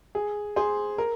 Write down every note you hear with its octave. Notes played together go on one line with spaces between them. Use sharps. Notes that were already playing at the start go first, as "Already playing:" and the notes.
G#4
G#4 C5
A#4